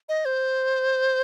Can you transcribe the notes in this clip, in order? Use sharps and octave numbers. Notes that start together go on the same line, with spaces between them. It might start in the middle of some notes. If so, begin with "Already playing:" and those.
D#5
C5